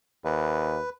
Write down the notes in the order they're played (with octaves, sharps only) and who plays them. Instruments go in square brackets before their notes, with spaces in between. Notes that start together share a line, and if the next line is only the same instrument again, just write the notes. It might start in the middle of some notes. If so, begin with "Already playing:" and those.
[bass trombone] D#2 [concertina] B4